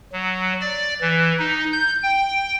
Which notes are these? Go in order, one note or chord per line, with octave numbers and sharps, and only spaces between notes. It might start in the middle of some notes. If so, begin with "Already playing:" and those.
F#3
D5
E3
D#4
G6
G5